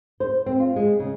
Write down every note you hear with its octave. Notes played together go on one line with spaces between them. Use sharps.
C5
C4
F4
G#3
C#3